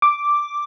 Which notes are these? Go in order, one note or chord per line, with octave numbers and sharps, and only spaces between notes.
D6